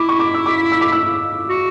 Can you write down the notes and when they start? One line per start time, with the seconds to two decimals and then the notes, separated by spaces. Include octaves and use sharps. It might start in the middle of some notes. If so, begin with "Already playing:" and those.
Already playing: E4 D6
0.09 C#6
0.19 D6
0.34 E6
0.46 D6
0.72 E6
0.81 D6
0.92 E6
1.49 F#4